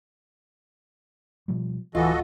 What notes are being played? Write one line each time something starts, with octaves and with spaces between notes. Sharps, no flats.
B2 F3 G3
D1 E3 F4 F#4 A4 D#5